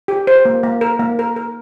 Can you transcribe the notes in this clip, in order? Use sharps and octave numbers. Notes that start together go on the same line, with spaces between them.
G4
C5
A#3
A#3
A#4
A#3
A#4
A#4